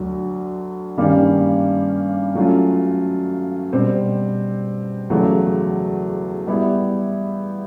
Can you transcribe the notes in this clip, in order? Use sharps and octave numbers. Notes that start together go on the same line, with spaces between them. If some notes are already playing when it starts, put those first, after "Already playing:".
Already playing: D2 D3 F#3
G2 D#3 G3 A#3 C#4
F#3 A3 C#4 F4
B2 G3 C4
E2 C#3 F#3 A3
G3 B3 E4 G4